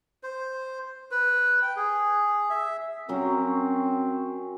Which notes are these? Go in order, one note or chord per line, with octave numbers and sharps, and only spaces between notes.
C5
B4
G5
G#4
E5
F#3 C4 C#4 A#4